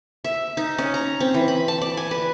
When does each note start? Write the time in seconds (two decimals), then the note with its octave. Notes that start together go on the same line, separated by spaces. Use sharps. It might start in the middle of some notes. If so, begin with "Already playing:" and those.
0.25 E5
0.57 D#4
0.78 C#4
0.94 A#5
1.20 C4
1.34 E3
1.48 B5
1.68 A5
1.82 D5
1.97 G#5
2.11 B4